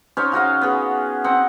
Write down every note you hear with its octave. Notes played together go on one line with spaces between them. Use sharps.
C#4 D#4 C5 C#5
C#3 F#4 D#5 F5
B3 G#4
C4 D#4 F#5